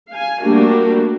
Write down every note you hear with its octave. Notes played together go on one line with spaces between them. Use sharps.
F5 G#5
G3 A3 A#3 D4 F#4 G4